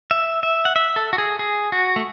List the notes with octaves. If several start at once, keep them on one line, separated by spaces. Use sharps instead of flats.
E5
E5
F#5
E5
A4
F#4
G#4
G#4
F#4
A3